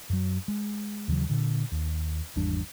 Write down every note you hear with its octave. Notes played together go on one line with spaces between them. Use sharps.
F#2 F#3
G#3
D#2 C#3 E3 F#3
A#2 D3
D#2
G#1 E2 G3 D4